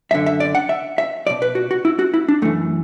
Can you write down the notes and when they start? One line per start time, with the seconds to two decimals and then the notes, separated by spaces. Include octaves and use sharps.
0.11 F#2 D3 E5
0.26 E5
0.40 D5
0.55 F#5
0.69 E5
0.98 E5
1.26 B1 D5
1.30 B2
1.42 B4
1.55 F#4
1.71 F#4
1.85 E4
1.99 F#4
2.14 E4
2.29 D4
2.42 F#2 E3 A3